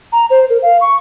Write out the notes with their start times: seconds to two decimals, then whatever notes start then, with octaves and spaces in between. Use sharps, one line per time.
0.13 A#5
0.30 C5
0.50 A#4
0.63 F5
0.81 C#6